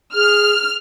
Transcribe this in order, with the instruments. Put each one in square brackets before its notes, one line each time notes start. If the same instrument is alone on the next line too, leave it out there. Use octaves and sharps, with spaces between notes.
[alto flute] G#4 [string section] F6